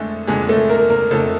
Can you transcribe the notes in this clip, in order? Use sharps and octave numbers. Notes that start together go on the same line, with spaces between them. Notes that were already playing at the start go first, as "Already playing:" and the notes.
Already playing: F2 D3 G#3 A3 A4
F2 D3 G#3 G#4
A3 A4
A#3 A#4
A#3 A#4
F2 D3 A3 A4